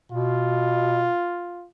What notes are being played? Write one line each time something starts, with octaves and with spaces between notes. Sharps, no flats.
B2 F4